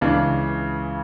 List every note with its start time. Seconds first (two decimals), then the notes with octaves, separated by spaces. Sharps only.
0.01 C#2 C#3 E3 D4